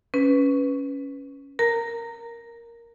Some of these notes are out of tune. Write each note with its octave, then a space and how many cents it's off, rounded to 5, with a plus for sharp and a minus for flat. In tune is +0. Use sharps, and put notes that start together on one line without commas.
C#4 +5 B4 +0
A#4 +0 A#5 -20